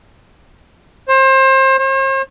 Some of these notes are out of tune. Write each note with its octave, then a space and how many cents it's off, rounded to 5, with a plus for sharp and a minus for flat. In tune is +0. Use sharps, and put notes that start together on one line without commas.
C5 +30
C5 +45